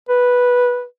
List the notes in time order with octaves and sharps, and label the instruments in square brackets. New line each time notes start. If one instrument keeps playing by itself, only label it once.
[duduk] B4